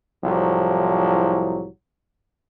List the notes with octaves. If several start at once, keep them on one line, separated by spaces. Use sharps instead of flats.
C2 A2 F3 F#3